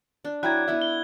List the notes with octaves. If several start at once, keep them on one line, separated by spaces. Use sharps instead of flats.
D4
F#3 E4 D5 G5 A#5 F#6 G#6
B3 E4 E5 G5
G7